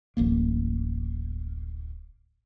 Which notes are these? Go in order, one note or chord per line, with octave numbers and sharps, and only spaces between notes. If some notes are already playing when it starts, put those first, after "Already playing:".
D1 A1 A#3